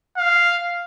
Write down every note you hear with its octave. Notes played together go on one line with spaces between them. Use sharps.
F5